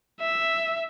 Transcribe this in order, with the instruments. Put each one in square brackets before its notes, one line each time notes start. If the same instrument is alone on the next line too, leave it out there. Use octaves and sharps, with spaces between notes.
[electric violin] E5